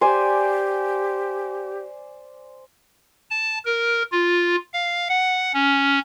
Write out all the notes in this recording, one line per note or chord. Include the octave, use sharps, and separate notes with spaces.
G4 C5 D5 G#5
A5
A#4
F4
F5
F#5
C#4